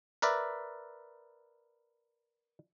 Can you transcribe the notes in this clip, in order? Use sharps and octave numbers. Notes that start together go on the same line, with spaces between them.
A#4 B4 D5 E5